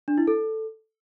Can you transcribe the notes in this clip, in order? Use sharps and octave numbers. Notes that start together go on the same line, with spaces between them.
D4
E4
A4